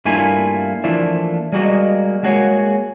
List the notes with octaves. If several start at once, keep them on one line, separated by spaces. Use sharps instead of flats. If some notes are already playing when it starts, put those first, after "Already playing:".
G2 A3 A#3 E4 F4 G#5
E3 F3 A3 A#3 D4 E4
G3 G#3 A#3 F#4 D#5
G#3 A#3 F#4 G#4 C#5 F#5